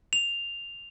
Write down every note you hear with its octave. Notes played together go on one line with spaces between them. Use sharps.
F7